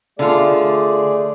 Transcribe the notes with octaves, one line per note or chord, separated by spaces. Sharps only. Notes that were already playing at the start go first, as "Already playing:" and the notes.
D3 A3 F4 G#4 D5